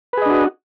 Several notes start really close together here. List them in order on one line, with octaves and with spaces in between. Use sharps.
B4 G#4 D#5 D4 F#4